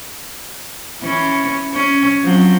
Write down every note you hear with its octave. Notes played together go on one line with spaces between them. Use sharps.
E3 C#4
C#4
F3 F#3 C4